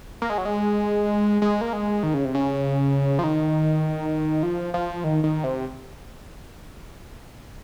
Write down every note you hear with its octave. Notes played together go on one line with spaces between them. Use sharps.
A#3
G#3
F#3
G#3
G#3
A#3
G#3
D#3
C#3
C3
C#3
F3
D#3
F3
F3
D#3
D#3
C3